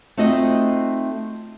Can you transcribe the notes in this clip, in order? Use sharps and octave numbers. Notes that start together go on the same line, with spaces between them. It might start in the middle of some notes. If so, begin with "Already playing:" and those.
A3 C4 D#4 F4 F#4 D#5